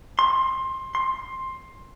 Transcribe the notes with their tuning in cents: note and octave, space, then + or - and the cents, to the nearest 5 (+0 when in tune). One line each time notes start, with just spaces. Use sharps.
C6 +20
C6 +15